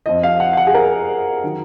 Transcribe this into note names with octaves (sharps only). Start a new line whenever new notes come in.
F2 F3 D#5
F5
F#5
F5
F#5
G#4
A#4
D#3 F#3